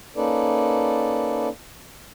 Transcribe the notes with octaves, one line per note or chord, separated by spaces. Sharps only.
A#3 C#4 D#4 A4 B4 D5